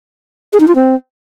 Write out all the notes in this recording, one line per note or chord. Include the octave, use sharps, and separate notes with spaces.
G#4
D#4
F4
C4